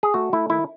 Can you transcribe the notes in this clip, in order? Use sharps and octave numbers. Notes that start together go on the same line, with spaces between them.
G#4
A3 F#4
A3 E4
D#3 E4